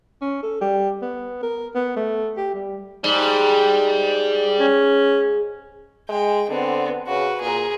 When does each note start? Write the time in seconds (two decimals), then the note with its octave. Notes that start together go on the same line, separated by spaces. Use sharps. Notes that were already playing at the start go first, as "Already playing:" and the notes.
0.21 C#4
0.43 A4
0.61 G3
1.02 B3
1.43 A#4
1.75 B3
1.96 A3
2.37 G4
2.54 G3
3.04 G#2 G3
4.60 C#4
6.09 G#3 G5
6.50 D3 B3 C4
7.08 C#3 F#4 B4
7.41 A#2 G#4 A#4